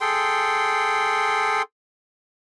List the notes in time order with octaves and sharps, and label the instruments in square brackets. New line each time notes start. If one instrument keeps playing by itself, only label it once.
[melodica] G#4 A4 G5 C6